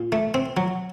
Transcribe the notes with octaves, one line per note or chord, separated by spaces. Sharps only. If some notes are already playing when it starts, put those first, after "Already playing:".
Already playing: A#2
A3
C4
F#3